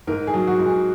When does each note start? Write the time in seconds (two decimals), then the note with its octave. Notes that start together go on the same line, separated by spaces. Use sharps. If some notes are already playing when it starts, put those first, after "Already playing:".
0.07 G#2 A#4
0.27 G#4
0.34 F#3
0.47 F#4
0.59 G#2
0.66 G#4